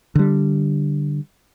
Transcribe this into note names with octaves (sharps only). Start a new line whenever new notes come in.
D3 G3